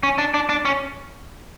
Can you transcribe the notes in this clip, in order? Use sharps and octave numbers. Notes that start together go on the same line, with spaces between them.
C#4
D4
D4
D4
C#4